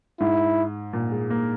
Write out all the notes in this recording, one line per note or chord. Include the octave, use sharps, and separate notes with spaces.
G#2 E4
A#2
G#3
A#3